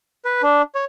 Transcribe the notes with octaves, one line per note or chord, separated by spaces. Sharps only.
B4
D4
C#5